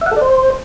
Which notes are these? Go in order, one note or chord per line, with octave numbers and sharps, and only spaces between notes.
E5
F#5
A4
D5
C5